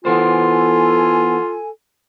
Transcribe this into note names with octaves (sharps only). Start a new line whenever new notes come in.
E3 B3 F4 A4 C5 G#5